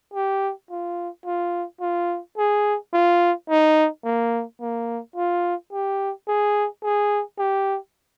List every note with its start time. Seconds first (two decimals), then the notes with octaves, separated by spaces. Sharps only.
0.14 G4
0.70 F4
1.26 F4
1.81 F4
2.38 G#4
2.93 F4
3.49 D#4
4.04 A#3
4.61 A#3
5.16 F4
5.72 G4
6.28 G#4
6.83 G#4
7.39 G4